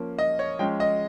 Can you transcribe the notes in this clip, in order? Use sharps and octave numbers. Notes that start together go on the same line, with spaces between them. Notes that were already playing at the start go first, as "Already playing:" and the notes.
Already playing: F3 A#3 C#4
D#5
C#5
F3 G#3 C#4 G5
D#5